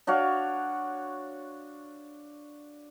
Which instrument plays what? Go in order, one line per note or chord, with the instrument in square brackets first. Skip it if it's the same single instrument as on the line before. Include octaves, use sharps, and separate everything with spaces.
[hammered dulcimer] D4 F#4 C#5 F5